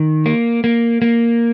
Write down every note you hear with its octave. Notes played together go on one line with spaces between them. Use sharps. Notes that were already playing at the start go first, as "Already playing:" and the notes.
Already playing: D#3
A#3
A#3
A#3